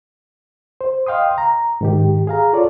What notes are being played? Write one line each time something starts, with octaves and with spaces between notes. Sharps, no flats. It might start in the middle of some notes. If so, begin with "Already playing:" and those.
C5
D#5 F5 G5 C6 D#6
A#5
G#2 D#3 G4
G#4 F5 A#5
F4 A4 C#5 D5